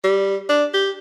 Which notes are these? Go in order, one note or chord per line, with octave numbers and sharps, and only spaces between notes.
G3
D4
G4